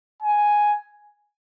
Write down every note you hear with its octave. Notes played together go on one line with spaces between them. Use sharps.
G#5